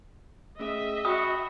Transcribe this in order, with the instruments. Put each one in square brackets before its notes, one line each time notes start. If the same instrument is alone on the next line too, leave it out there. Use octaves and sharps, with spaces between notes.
[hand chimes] A3 C#4 G#4 [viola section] D#5 E5
[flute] F#4 [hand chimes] G5 B5 [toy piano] D#6